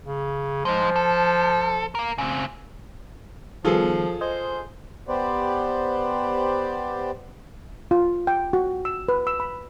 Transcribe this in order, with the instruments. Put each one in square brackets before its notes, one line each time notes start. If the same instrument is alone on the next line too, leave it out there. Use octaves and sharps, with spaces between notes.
[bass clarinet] C#3
[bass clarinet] F3 [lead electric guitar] G#3 D#4
[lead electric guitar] A4
A#4 F5
C#3 C4
[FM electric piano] D#3 G3 B3 [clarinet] F3 [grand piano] F4 G#4 A4
[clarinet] C5 [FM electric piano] D#5 G#5 C6
[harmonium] B3 G4 B4 C5 D5
[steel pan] F4
G5
F#4
E6
B4
E6
B5